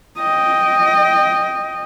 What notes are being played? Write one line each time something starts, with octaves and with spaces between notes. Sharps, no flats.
D#5 G5